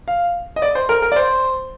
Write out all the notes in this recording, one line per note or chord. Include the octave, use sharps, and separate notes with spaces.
F5
D#5
D5
C5
A#4
A#4
D5
C5